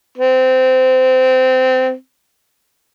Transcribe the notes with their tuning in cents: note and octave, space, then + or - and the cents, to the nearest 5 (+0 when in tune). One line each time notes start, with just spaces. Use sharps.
C4 -20